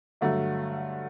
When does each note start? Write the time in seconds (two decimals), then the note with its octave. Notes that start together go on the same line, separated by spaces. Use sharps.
0.21 G2 D3 F#3 A3